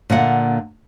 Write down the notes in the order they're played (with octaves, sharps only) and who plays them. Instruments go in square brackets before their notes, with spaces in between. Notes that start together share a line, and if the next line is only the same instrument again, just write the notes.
[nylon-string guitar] A#2 D3 A#3 F#5